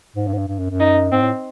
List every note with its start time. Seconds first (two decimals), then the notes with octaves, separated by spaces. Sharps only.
0.16 G#2
0.27 G2
0.33 G#2
0.38 G2
0.48 G2
0.59 F#2
0.70 F#2
0.80 D#4
1.12 G#2 C4
1.21 A2